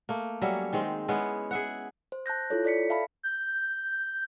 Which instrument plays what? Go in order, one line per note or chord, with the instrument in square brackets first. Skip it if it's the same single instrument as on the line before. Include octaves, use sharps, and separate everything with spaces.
[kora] A3 A#3
F#3 G3 C#4 E5
D#3 G#3 C4
G#3 B3 C#4 E4
G#4 E5 F#5
[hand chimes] C5
A5 F#6 G6 A#6
E4 F4 A4 C#5
A4 D5 B6 C#7
E5 F5 A5 B5
[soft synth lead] G6